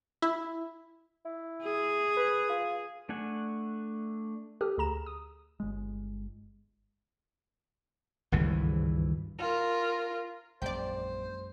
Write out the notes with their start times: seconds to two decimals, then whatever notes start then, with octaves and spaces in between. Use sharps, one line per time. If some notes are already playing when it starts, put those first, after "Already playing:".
0.22 E4
1.25 E4
1.63 G#4
2.17 B4
2.50 F4
3.09 A3 D4 F#5 G#5
4.61 G4 A4 D#6 F6
4.78 D2 G#4 A#5 E7
5.06 D#6
5.60 G1 G#3
8.32 G#1 C#2 G2 E3
9.39 F4 A#4
10.62 A#1 F#2 G#3 C5 D5 G5